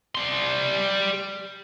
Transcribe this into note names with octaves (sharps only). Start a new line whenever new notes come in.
G3 C6